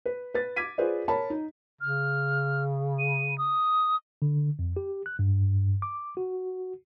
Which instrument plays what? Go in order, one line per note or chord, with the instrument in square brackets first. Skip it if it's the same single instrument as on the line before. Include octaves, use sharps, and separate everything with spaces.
[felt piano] B4
B4 A6
D6 G#6 B6 D#7
F4 G#4 B4 C5 D5
A#4 C#5 A5 B5
D#4
[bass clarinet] C#3 [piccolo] F6
[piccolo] D#7
D#6
[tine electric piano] D3
F2
G4
F#6
G2
D6
F#4